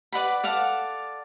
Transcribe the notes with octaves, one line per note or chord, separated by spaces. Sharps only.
B4 D5 F#5 B5
A4 D5 F5 F#5